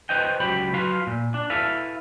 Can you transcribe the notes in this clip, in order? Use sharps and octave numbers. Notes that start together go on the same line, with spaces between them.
B4 C5 D#5 G5
C#2 F#3 G4 B5
F#3 F4 B4 F5
A#2
D4
E4 A4 B4 F5